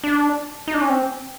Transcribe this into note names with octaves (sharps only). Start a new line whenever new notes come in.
D4
D#4
D4
C#4
C4